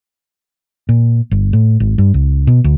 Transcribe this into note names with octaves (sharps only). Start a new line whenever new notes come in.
A#2
G1
A2
G#1
G2
C#2
B2
D2